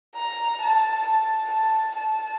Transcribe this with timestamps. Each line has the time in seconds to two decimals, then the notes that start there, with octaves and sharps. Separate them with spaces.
0.16 A#5
0.62 A5
1.06 A5
1.51 A5
1.96 A5